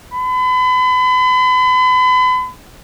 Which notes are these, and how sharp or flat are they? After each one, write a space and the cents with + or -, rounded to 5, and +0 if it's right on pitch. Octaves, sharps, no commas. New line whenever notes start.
B5 +40